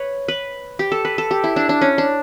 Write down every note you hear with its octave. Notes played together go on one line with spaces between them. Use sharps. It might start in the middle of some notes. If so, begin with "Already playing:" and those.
Already playing: B4 C#5
B4
G4
A4
B4
A4
G4
E4
D4
D4
C#4
D4